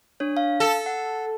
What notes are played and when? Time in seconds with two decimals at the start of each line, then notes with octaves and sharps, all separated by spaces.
0.20 D4 C#5
0.37 F5
0.60 A4
0.86 F#5